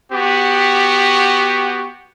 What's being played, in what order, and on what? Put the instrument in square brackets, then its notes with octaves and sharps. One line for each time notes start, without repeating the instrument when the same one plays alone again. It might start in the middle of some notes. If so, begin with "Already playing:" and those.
[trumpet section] B3 F#4 G4